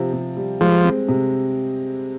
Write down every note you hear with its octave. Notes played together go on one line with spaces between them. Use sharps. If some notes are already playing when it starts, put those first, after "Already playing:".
Already playing: C3 F3 C4
C3
G3
F3 G#3
C4
C3